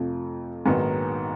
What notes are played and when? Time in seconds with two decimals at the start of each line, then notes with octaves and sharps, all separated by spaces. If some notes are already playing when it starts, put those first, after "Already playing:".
Already playing: F2 C3 F3 A3
0.66 A#1 G#2 D#3 F#3 B3